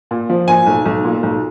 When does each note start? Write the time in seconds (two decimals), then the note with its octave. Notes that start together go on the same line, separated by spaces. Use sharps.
0.11 A#2
0.29 F3
0.48 A#2 G#5
0.67 B1
0.86 B1
1.05 A#2
1.23 B1